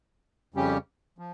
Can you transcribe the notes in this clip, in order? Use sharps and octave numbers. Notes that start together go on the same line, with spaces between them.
F2 C#3 G3 C#4 G4
F3